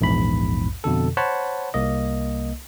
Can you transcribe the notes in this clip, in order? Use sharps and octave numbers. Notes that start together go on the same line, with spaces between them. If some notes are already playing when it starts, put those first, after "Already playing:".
A#1 E2 G#2 B5
F2 B2 D3 A4
C5 C#5 F#5 A5 B5
C2 A#3 D#5